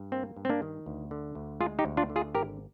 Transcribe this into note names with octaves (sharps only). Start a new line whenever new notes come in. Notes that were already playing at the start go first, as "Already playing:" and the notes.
Already playing: G2
A#3 C4
G2
C4
A#3 D4
D#3
D2
D3
D2
G#3 F4 G#4
D#4 G4
D2
D4 F4
D3
F4 G#4
G#1 G4 A#4